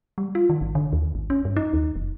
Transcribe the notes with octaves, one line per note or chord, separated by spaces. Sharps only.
G3
F4
D#3
G#1
D3
D#2
G#1
C#4
G2
D#4
D#2
F1